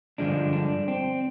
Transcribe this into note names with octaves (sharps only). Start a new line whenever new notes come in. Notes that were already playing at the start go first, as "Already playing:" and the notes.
G2 D3 F3 G#3 D4
D4
C4